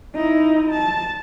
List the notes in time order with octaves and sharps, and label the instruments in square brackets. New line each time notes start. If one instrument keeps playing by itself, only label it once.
[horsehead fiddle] D#4 E4
A5